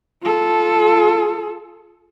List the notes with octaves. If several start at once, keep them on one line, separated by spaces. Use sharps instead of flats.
F4 A4